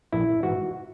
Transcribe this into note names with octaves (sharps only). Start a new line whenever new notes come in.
A#1 E4
G#2 E3 F#4